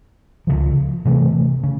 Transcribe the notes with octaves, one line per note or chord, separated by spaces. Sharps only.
C#2 C#3 F3
C3 E3 A3
C#3